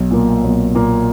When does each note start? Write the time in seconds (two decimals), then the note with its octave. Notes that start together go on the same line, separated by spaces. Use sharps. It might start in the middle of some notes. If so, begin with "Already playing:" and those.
Already playing: B1
0.11 A#2 A#3
0.44 B1
0.75 A#2 A#3